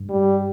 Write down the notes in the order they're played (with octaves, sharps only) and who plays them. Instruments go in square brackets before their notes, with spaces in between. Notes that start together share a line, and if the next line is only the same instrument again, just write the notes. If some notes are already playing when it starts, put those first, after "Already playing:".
Already playing: [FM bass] G2
[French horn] G3